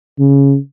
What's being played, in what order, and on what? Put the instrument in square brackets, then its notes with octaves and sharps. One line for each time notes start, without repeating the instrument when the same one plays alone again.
[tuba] C#3